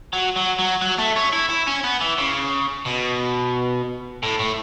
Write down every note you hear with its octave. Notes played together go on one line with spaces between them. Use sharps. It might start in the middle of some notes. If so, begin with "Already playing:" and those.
F#3
F#3
F#3
F#3
A3
C#4
E4
E4
C#4
B3
E3
C#3
B2
A2
A2